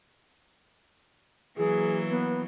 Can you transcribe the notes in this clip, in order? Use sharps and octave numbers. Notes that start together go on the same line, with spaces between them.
E3 F#3 A#3 G#4
B3